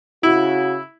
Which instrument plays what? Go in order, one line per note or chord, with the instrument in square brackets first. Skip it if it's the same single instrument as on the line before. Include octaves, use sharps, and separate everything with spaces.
[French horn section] C#3 F#4 [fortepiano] E4